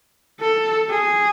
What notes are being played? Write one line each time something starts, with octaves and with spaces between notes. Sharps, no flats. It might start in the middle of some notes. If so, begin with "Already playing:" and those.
A4
G#4